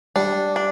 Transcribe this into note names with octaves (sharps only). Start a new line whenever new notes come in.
G3 D4
D4